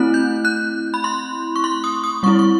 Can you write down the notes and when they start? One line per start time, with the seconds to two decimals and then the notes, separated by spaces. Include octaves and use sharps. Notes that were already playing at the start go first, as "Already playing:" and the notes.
Already playing: A3 C4 E4 F#6
0.14 G6
0.45 F#6
0.94 B5
1.04 C6
1.56 C#6
1.64 C6
1.84 D#6
2.04 D#6
2.23 G3 C4 E4 C#6
2.39 C#6